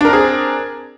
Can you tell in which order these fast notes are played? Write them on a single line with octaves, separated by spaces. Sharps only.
D4 A#4 C4 G#4